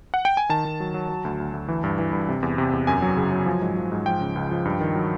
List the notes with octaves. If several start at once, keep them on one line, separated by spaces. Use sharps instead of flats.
F#5
G5
G#5
D#3 A5
D#3
F#3
F#3
F#3
D2
D2
D2
E3
G2
E3
G2
C3
E2
C3
E2
F#2 G#5
F#3
C#3
F#3
F3
G#2
F3
G#2
F3 G5
C#3
C#2
F3
G2
D#3
F#3